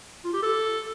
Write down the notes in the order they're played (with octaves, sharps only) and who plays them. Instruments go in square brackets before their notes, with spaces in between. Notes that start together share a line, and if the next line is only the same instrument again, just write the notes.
[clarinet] F4
G4
A4